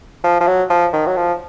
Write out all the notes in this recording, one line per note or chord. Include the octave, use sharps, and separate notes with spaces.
F3
F3
F#3
F3
D#3
F#3
F3